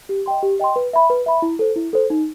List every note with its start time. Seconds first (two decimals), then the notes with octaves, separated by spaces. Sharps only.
0.09 G4
0.26 D#5 G5 C6
0.43 G4
0.60 D#5 G5 C6
0.76 B4
0.93 E5 B5
1.10 B4
1.26 E5 B5
1.42 E4
1.59 A4 C5
1.76 E4
1.93 A4 C5
2.10 D#4